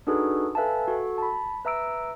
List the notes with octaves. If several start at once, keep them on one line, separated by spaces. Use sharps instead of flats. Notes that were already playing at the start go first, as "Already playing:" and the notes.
D4 D#4 F#4 G#4 A4 B4
A4 B4 E5 F5 G#5 A5
F#4 A4
A5 B5
B4 E5 A#5 E6 D7